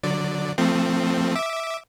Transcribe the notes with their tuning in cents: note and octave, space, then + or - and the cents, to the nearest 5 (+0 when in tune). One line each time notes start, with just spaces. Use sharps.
D3 +5 F#3 -10 D5 +0
F3 +0 A3 +30 C4 +0
E5 -10 D6 +0